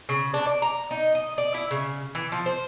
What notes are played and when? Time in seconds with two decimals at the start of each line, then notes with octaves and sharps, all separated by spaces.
0.09 C#3
0.34 D4
0.47 D5
0.62 A#5
0.91 D#4
1.15 D#5
1.38 D5
1.54 E4
1.71 C#3
2.15 E3
2.32 F3
2.46 C5